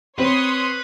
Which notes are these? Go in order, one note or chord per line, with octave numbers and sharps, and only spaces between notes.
C4 B4 C#5 C6 D#6